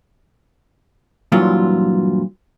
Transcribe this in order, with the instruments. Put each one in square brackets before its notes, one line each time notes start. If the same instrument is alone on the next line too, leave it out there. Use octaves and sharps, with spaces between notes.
[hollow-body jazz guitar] G2 A#2 E3 F#3 F4